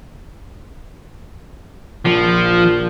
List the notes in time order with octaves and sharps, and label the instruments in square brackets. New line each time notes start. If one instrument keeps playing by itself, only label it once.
[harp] A#1 [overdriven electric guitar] F3